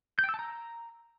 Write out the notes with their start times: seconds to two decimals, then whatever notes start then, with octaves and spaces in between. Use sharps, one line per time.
0.19 G6
0.24 G5
0.29 E6
0.34 A5
0.39 A#5